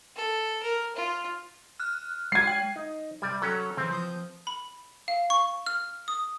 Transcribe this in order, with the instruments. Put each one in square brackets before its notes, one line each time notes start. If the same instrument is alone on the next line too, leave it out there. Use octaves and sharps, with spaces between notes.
[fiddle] A4
A#4
F4
[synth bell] F6 F#6
[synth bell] G#3 D#7 [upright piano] G#6 C7
[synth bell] G5
[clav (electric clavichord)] D#4
[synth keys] C3 G#6 [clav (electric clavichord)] G3 D5
[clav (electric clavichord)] F#3 C#4 [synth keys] A4 A#5
[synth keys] C#3 E3 [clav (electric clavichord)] C4
[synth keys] F3 D#6 G6
[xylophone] B5
F5
C#6
F6
D#6